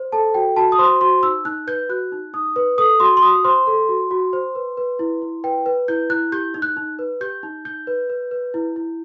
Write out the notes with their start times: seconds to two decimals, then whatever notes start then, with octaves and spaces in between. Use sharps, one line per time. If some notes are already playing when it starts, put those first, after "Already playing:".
Already playing: C5
0.12 A4 A5
0.34 F#4 G5
0.56 F#4 A5
0.72 D#6
0.79 C5 C6
1.01 F#4 C6
1.23 D#4 E6
1.45 D#4 F#6
1.67 B4 G6
1.89 F#4 F#6
2.12 D#4
2.34 D#4 D#6
2.56 B4
2.78 A4 D#6
3.00 F#4 C6
3.17 C6
3.22 F#4 D#6
3.44 C5 C6
3.67 A4
3.89 F#4
4.11 F#4
4.33 C5
4.55 B4
4.77 B4
4.99 E4
5.22 E4
5.44 B4 G5
5.66 B4
5.88 E4 G6
6.10 E4 F#6
6.32 G4 G6
6.54 D#4
6.62 F#6
6.77 D#4
6.99 B4
7.21 G4 G6
7.43 D#4
7.65 D#4 G6
7.87 B4
8.10 B4
8.31 B4
8.54 E4
8.76 E4